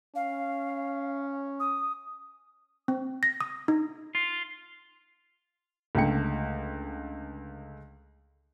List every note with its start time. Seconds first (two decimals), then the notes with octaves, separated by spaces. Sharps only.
0.15 C#4 F5
1.60 D#6
2.88 C4
3.23 A#6
3.41 D#6
3.68 D#4
4.15 F4
5.95 C#2 D3 A3 G5 C#7